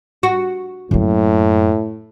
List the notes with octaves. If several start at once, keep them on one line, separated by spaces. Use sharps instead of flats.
F#4
F#2 A2 A#3